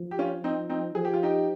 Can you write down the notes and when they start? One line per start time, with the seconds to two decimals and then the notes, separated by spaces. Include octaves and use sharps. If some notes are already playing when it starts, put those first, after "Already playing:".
Already playing: F3
0.11 G4
0.19 C#4 F4
0.44 C4 D#4
0.70 C4 D#4
0.95 F3 G#4
1.05 G4
1.14 F4
1.23 D#4 G4